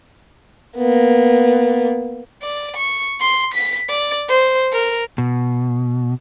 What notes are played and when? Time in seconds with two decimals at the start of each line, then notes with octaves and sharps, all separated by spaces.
0.77 A#3 B3
2.42 D5
2.77 C#6
3.21 C6
3.54 B6
3.89 D5
4.29 C5
4.73 A#4
5.18 B2